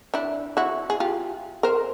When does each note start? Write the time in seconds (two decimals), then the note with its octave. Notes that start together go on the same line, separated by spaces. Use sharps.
0.14 D4 E4
0.57 E4 F#4
0.90 G#4
1.00 F4 G4
1.63 A#4 C5